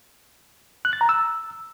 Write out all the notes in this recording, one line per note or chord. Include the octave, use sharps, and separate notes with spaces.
F#6
A6
A#5
E6